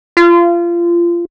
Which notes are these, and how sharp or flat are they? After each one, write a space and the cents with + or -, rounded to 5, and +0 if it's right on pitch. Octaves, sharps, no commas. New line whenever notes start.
F4 -25